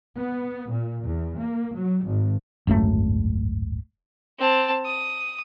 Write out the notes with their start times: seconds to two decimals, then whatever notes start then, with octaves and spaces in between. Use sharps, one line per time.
0.17 B3
0.71 A#2
1.04 E2
1.40 A#3
1.76 F#3
2.05 G#1
2.67 D1 G#1 F#2 A3
4.38 C4 A5
4.85 D#6